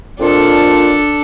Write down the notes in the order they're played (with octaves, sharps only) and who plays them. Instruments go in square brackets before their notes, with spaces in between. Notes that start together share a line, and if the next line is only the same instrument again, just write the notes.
[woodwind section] F2 A#2 F4 [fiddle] D4 A4